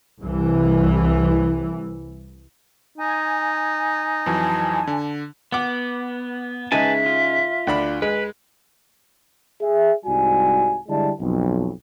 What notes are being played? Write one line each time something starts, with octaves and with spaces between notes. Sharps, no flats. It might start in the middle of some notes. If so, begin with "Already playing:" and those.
C2 E3
D#4 G#5
F2 E3 F#3 A5
D3
B3 F#5 D6
C#3 G#3 D#4 B4 E5 G#5 A5
F4
D2 D4 B5
G#3 B4
G#4 E5
C2 G#2 G3 F#4 G#5
D3 G3 G#3 E4 D5 A5
B1 F2